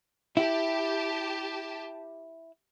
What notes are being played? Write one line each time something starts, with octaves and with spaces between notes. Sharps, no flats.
E4 G4 A5